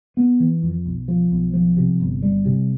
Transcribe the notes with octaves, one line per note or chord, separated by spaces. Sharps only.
B3
E3
F2
B1
F3
B1
F3
C3
G1
G3
C3